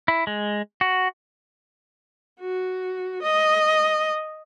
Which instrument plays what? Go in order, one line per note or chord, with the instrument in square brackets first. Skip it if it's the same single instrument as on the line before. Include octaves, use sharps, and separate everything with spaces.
[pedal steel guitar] E4
G#3
F#4
[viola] F#4
D#5